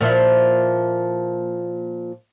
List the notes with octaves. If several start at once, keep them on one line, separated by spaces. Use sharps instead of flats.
A#2 F3 E4